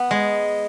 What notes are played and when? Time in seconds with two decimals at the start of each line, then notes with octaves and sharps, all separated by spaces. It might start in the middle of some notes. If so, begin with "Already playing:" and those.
Already playing: B3
0.11 G#3